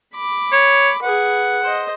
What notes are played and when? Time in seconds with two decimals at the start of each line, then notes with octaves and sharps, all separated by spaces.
0.14 B5 D6
0.52 C#5
1.03 G#4 B4 F#5
1.63 C5 D#5